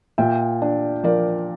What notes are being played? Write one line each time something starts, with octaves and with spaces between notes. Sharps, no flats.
A#2 E5 G5
D4
F3 A#4 D5